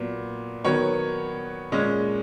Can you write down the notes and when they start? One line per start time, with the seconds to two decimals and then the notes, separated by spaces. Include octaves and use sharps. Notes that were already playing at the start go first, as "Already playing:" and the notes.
Already playing: A#2 F#3 B3
0.64 D#3 F#3 B3 C#5
1.72 A#2 G#3 C#4